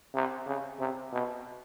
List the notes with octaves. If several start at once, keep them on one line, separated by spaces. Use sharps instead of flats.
C3
C#3
C3
B2